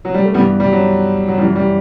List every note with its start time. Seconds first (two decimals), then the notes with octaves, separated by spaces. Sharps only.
0.05 F#3
0.14 G3
0.23 A3
0.34 G2 E3 G3 B3
0.60 G3
0.72 F#3
1.28 F#3
1.38 F#2 G3
1.41 E3
1.56 G3